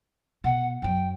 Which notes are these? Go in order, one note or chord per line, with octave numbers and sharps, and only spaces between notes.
B2 F#5
F#2 F#3 G5